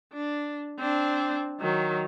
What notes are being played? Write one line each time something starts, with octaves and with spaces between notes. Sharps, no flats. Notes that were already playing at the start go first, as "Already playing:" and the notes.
D4
C4 D4
D#3 F#3